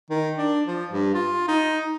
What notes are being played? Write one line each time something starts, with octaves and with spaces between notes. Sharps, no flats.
D#3
D4
F3
G2
F4
D#4